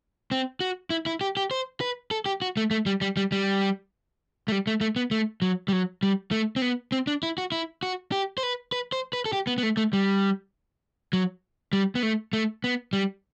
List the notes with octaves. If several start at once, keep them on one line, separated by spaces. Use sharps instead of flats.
C4
F#4
E4
E4
G4
G4
C5
B4
A4
G4
F#4
A3
A3
G3
G3
G3
G3
A3
G3
A3
A3
B3
A3
F#3
G3
F#3
G3
A3
C4
B3
C4
D4
E4
F#4
E4
F#4
G4
C5
B4
B4
C5
B4
A4
G4
B3
B3
A3
A3
G3
F#3
G3
B3
A3
A3
B3
G3